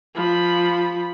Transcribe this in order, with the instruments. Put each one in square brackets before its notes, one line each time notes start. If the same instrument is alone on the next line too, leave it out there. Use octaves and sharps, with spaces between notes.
[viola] F3 B5